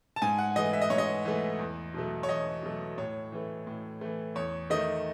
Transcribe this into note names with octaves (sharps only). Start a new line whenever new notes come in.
A5
G#2 G#5
F#5
E3 A3 D#5
E5
D#5
G#2 C#5
D#5
E3 A3
E2
B2 F#3 A3
C#5
E2 D#5
B2 F#3 A3
A2 C#5
E3 A3
A2
E3 A3
E2 C#5
D#3 A3 D#5